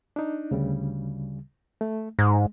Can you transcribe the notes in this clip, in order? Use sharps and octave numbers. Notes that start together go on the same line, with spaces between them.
D4 D#4
D2 C#3 G3
A3
G#2 G#3